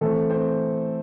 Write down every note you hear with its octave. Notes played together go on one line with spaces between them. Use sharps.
E3 A3 C4 A4
C4 C5